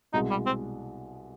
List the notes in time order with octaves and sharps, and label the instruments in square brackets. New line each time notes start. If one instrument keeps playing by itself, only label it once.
[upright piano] C2 B2 G#3 [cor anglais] D#4
[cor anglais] G3
C4